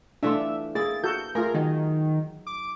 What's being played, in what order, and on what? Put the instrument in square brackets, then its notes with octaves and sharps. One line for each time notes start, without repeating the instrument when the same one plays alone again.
[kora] E3 A3 F4 [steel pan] D4 [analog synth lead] E5
[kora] A#3 E4 [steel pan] G#4 [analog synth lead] A6
[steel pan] F#4 A4 [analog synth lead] G6
[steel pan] A3 F4 [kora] G#4 [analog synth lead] A#4
[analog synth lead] D#3 [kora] F#3 D#4
[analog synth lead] D6